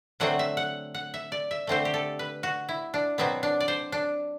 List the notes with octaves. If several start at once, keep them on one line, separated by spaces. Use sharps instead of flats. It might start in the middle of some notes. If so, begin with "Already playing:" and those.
D3 F#3 A3 C4 F#5
E5
F#5
F#5
E5
D5
E5
D3 A3 C4 C5
G4
A4
B4
F#4
E4
D4
B2 F#3 B3 C4
D4
D5
C5
D4